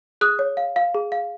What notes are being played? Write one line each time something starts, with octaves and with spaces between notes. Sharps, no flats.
G#4 D#6 F#6
C#5
F5
F5
G#4
F5